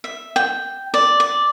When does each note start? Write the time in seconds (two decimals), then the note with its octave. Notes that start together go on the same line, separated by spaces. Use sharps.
0.04 E5
0.36 G5
0.94 D5
1.20 D5